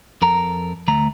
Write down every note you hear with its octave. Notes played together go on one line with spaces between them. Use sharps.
F2 A4 A#4 A#5
D2 A3 A#5